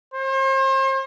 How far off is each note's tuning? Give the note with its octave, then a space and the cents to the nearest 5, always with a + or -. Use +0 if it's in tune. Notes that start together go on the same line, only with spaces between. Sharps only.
C5 +40